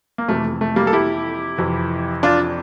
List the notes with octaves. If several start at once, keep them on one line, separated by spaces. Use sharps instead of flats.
A#3
F2 C3 E3 A3
A3
G3 A#3
A4
E4 G4
F2 C3 E3
D4 F4